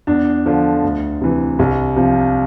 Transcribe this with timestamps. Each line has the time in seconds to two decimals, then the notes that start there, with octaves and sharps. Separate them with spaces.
0.07 E2 D4
0.46 D3 F3
0.83 D2
1.21 C3 E3
1.59 C2
1.96 C3 F3